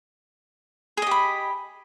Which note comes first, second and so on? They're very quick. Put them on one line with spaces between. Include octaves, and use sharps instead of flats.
G#4 D#5 G4 B5